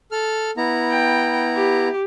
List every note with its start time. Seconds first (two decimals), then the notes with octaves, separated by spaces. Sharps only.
0.11 A4 F6
0.57 B3 E4 A#5
0.91 G5
1.56 G4